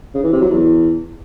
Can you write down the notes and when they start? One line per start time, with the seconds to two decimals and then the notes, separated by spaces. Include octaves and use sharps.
0.14 C#3
0.23 E3
0.32 C3
0.41 F#3
0.50 E2